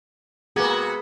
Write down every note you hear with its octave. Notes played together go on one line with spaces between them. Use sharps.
C3 A#3 F#4 G#4 B4